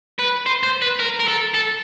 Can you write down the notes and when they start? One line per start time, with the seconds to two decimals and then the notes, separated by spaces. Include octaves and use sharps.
0.19 B4
0.46 C5
0.63 C5
0.82 B4
1.00 A#4
1.20 A#4
1.28 A4
1.55 A4